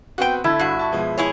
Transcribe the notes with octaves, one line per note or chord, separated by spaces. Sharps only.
B3 C4 F#4 F#5 G5
D3 A3 E4
G2 F#4
A5 C#6
B2 F3 G#3
E4 G#4 C#5